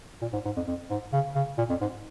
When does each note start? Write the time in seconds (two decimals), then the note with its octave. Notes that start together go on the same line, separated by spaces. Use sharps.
0.21 A#2
0.33 G#2
0.45 G#2
0.56 F2
0.67 F2
0.90 G#2
1.13 C#3
1.35 C#3
1.58 A#2
1.69 F2
1.81 G#2